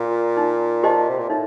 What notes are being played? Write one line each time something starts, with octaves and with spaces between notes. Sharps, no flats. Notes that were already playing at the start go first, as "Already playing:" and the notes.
Already playing: A#2
D#4
G4 C5 D#5 A5
C3
A#2
A2 D#4